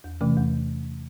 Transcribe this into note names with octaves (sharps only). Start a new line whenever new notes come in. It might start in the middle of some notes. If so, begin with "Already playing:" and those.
E2
C3 E3 A3 C#4
E2